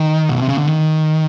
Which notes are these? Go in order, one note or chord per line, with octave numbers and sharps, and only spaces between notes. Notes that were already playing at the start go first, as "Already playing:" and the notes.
Already playing: D#3
B2
C3
C#3
D3
D#3